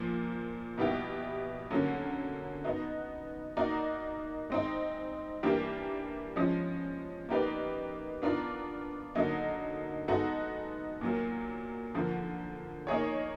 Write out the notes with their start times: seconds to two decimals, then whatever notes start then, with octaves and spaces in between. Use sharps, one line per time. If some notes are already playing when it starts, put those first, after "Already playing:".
Already playing: A#2 F3 A#3
0.78 B2 G3 B3 E4 G4
1.71 D3 F#3 A#3 C#4
2.64 B3 D#4 F#4
3.57 A#3 D#4 F#4 A#4 D5
4.50 G#3 C4 D#4
5.43 E3 G3 A#3 D4 G4
6.36 F3 G#3 C#4
7.29 A#3 D#4 G4 B4 D5
8.22 B3 D4 F4 A#4 D5
9.15 D3 F#3 A#3 D#4
10.08 G#3 B3 D#4 F#4 A4
11.01 A#2 F#3 A#3
11.94 D3 F3 A#3
12.87 A#3 D#4 G#4 C#5